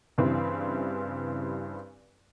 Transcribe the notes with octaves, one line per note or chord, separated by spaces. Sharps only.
G2 C#3 E3 G3 C4